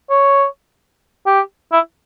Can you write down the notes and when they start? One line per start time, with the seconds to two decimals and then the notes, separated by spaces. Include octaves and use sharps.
0.10 C#5
1.26 G4
1.72 E4